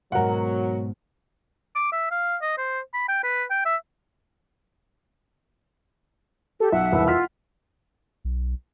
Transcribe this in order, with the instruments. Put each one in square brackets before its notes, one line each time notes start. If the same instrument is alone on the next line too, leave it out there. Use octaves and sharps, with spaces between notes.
[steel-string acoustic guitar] G#2 B2 [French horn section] F#3 [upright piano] A#4 F#5
[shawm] D6
E5
F5
D#5
C5
B5
G5
B4
G5
E5
[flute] G4 [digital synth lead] A4
[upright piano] B1 [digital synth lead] E5 [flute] F#5
[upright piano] E1 C2 B4
[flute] F4 [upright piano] F#5 F6 B6
[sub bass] B1